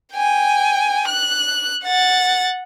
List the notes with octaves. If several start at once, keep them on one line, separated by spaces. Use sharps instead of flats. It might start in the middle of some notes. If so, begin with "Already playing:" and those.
G5 G#5
F#6
F#5 A6